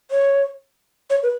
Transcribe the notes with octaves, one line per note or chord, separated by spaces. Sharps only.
C#5
C#5
B4